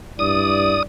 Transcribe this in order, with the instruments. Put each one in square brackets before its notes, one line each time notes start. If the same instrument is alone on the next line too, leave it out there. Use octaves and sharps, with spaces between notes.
[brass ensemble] G2 E4 D5 [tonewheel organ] D#6